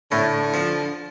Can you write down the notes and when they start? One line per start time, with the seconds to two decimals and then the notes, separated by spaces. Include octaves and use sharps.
0.11 A2 D3
0.54 F3